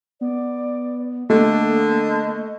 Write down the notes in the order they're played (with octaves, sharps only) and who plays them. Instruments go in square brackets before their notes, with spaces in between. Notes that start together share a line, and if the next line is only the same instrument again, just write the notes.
[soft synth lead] B3 [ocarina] D5
[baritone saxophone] D3 [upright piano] A3 [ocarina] A#3 [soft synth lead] D#5